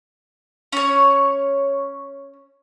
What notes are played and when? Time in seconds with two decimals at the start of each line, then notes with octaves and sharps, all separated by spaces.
0.72 C#4 C#5